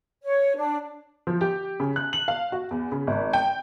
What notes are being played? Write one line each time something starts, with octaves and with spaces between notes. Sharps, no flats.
C#5
D4
F3
G4
C#3
F#6
F#7
F5
F#4
E2
C#3
G#1
G5